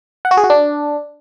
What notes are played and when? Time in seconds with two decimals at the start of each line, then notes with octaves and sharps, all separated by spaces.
0.25 F#5
0.31 F#4
0.37 G#4
0.44 F#4
0.50 D4